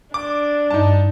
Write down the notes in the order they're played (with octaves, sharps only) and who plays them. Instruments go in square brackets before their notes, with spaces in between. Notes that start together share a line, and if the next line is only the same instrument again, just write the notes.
[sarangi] D4 [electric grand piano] D6
[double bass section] G2 [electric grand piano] D#4 A5